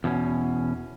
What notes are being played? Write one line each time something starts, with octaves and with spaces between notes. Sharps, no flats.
E2 B2 C#4